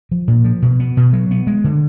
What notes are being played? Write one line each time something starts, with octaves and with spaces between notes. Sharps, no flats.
F3
A#2
F3
B2
B3
B2
F#3
B3
G#3
D3